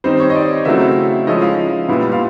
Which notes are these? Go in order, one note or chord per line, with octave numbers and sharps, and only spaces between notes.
D#3 G3 C4 D#4 C5
C#5
D#5
D5
C#3 F#3 A3 C4 E4 E5
F3 G#3 C#4 E4 D#5
F5
A#2 G3 B3 E4
F5